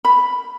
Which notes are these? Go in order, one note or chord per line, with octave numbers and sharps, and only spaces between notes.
B5